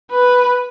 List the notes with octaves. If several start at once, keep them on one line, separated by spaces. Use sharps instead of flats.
B4